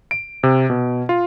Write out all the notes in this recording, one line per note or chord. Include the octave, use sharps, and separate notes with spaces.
D7
C3
B2
F4